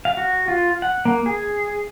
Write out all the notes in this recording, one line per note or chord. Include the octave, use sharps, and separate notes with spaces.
F5
F#4
F4
F#5
A#3
G#4